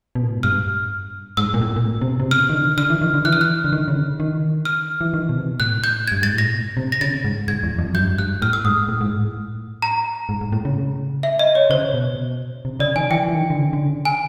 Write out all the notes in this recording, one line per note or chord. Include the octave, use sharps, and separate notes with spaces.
B2
A#2
A2
G#2
G2 F6
G#2 E6
A#2
A2
A#2
A2
C3
B2
C3
C#3 F6
D#3
D3
D3 F6
E3
D#3
D3
E3 F#6
F6
F#6
D3
D#3
C#3
D3
D#3
F6
E3
D#3
B2
C3
A2 F#6
G6
G#6
G2
G#2 A6
A2
A#2 A#6
B2
C3
A#6
C#3 A6
G#2
G#2 G#6
E2
F2
F#2 G6
G2
F#2
G2 F#6
A2 F6
E6
G#2 D#6
A2
G#2
A2
A#5
G#2
G#2
A2
C#3
E5
D#5
C#5
C#3 C5
B2
C3
C#3 D5
D#3 G#5
E3 G5
E3
D#3
D3
C#3
D3
C#3
G#5